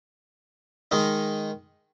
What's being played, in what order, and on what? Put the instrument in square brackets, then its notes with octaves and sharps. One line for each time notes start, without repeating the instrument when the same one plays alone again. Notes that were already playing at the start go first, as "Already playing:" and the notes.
[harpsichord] D#3 G#3 D#4 A#4